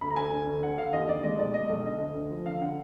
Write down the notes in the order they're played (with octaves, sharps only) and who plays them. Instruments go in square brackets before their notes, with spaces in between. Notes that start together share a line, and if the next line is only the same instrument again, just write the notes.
[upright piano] D2 B5
A#5
D2 G#5
D3
D2
D3 F#5
D3 F5
D#2 D#5
D#2 D5
G#3 D#5
B1 D5
G#3 D#5
B1
D3 D#5
D2
D2
F3
D3 F5
D3 F#5